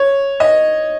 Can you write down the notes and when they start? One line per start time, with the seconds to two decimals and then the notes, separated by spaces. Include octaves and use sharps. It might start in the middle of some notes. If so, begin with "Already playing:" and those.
Already playing: C#5
0.40 D#5